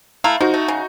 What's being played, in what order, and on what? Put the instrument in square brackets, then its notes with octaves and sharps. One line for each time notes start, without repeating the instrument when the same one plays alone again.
[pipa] A3 E4 A#5 [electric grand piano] F5
[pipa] F3 [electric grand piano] D#4 F#4
[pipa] A3
C#3